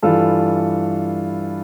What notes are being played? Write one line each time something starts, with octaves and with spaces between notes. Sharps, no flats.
G2 E3 F4 A4